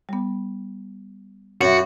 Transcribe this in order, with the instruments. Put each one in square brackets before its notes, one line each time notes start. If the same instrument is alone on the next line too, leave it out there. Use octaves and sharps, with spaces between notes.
[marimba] G3 B3
[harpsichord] F#2 [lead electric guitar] F#4 [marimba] C#5 E5